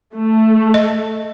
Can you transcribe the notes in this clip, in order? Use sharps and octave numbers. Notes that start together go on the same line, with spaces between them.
A3
D#5